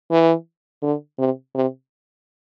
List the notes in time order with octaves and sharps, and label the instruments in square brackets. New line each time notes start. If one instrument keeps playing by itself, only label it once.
[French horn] E3
D3
C3
C3